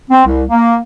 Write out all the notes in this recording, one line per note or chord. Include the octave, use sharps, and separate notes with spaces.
C4
C2
A#3